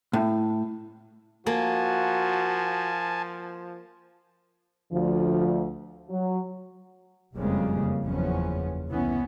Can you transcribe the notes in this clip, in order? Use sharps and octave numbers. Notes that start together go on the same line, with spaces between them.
A2
F3 A#3 F#4 G#5 A5
D2 F3
F#3
F#1 F2 C#3 G3 G#3 A#3
F#1 E2 F3 B3 C#4
C2 E3 B3 C#4